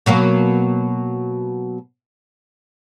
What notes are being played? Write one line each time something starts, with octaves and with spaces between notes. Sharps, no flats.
B2 F#3 A#3